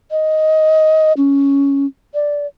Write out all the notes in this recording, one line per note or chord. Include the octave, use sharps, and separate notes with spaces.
D#5
C#4
D5